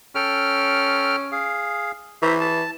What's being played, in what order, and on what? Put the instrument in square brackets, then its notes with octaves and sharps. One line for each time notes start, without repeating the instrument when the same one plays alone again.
[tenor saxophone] C#4 [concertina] A4 G5 F6
[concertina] G#4 F5
[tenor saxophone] E3 [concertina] C5 E5 A#5
[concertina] A5